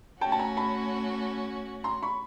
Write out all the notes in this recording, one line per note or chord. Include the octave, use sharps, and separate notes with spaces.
A3 C#4 F#4 G5 A5
A5
G#5 A#5
A5 B5
A#5 C6
B5 C#6